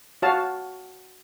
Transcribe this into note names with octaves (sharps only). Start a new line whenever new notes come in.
F#4 C#5 F5 A5